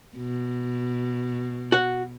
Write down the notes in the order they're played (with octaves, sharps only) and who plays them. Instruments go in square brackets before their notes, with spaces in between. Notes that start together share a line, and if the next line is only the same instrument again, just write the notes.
[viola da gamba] B2
[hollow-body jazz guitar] F#4 F#5